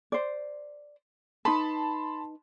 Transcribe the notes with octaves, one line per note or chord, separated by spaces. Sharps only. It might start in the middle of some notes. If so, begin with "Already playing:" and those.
C5 D5
D#4 B4 A5 B5 C6